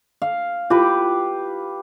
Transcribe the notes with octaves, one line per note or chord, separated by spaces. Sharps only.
F5
E4 F4 G4 B4